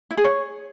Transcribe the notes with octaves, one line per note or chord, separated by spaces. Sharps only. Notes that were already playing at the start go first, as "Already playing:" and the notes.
E4
G#4
C#5